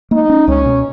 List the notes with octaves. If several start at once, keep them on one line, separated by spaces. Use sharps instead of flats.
A#3 D#4
C#4
C#2 C#4
B2